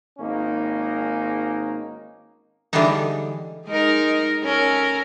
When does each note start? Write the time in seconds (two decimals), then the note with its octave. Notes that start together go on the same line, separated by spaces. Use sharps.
0.18 G#1 A#3 C#4 D#4
2.73 D3 E3 G3 G#3 B3 D#4
3.67 G#3 D#4 A#4
4.44 C#4 A4 A#4